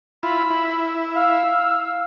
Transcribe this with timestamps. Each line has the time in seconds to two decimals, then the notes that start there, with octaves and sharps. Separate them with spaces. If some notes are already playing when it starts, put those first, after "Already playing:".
0.23 E4 F4 B5
0.50 E4
1.16 F5 E6